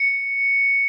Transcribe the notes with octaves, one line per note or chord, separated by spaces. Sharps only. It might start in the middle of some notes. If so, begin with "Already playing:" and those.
Already playing: C#7